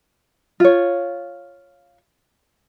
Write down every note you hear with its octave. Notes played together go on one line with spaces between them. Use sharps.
F4 C#5